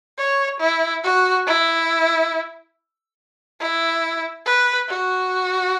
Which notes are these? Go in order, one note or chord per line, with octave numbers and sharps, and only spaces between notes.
C#5
E4
F#4
E4
E4
B4
F#4